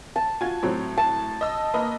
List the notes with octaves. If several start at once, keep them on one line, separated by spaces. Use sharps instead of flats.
A5
F4 F#4 G#5 G#6
A2 F#3 C4
A5
D#5 E6
A#3 B4 D#5